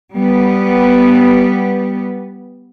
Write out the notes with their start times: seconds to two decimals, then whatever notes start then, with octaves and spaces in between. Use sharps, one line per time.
0.15 G3 B3